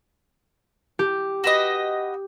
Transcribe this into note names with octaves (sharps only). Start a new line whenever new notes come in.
G4
F#4 B4 D#5